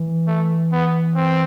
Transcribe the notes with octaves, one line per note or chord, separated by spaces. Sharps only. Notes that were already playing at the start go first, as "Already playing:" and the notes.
Already playing: E3
A3
B3
C4